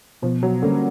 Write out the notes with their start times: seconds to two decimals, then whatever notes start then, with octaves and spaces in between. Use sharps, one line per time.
0.22 B2 F3
0.43 F#3
0.62 D3 G3 A#3 C#4